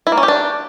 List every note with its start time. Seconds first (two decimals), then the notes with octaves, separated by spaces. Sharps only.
0.07 E4
0.12 A#3
0.17 C#4
0.23 G4
0.28 D4